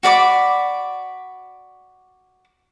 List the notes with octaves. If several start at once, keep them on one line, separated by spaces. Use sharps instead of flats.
F#4 D5 B5 D6